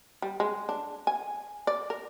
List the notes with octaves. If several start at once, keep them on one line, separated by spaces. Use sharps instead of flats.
G3
G#3
D4
G#5
D5
A#4